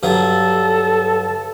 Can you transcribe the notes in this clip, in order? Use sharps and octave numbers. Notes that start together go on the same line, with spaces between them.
G2 F#3 A4